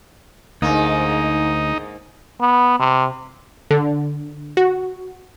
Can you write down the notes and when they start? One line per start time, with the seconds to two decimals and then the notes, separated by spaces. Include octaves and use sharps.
0.62 D2 G#2 A#3 D#4
2.41 B3
2.80 C3
3.71 D3
4.57 F#4